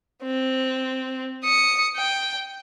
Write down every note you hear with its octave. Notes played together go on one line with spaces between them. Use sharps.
C4
D#6 C#7
G5